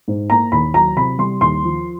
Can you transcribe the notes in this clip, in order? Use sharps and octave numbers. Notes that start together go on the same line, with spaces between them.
G#2
A#3 A#5
D#2 B5
F#3 A#5
C3 B5
G3 C6
D#2 C6
F3